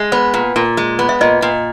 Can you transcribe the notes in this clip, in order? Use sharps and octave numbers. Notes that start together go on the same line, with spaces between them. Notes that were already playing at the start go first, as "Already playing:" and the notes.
Already playing: G#3
B3 B4
A#2
A#2
G#3
B3
E5
A#2 D#5
A#2